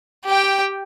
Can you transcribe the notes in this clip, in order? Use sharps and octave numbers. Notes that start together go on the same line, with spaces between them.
G4 G5